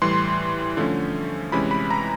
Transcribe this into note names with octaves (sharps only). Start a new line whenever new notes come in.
A2 E3 G3 C6
D3 F3 A3 C#4
C3 E3 G#3 C#4 B5
B5
A#5